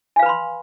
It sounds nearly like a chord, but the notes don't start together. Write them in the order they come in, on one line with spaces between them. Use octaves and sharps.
G#5 F5 B4 B5 C6